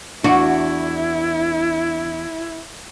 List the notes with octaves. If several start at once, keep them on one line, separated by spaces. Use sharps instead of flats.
E2 D4 E4 F#4